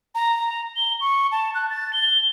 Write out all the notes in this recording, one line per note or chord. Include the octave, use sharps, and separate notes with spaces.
A#5
G7
C#6
A5
F#6
A6
G7